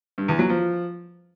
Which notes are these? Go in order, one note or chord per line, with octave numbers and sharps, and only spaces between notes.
G2
E2
F#3
F3